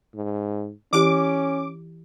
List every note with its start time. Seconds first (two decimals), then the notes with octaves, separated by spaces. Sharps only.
0.15 G#2
0.93 E3 C#4 E4 G4 D6